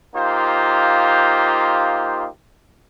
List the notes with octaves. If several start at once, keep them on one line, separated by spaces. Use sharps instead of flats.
A#3 D#4 F4 G4 C5